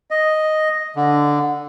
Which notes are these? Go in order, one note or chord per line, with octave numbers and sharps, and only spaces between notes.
D#5
D3